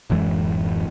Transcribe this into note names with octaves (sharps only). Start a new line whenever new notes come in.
D1 F#2 E3 G#3